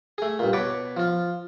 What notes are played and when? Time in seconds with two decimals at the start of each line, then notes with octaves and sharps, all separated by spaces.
0.18 A3 G#4
0.39 G2 A#2
0.53 B2 B4 C#5 A5 D6
0.97 F3 F4